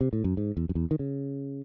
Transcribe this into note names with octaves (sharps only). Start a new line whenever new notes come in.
C3
A2
F#2
G#2
E2
F#2
E2
D#3
C#3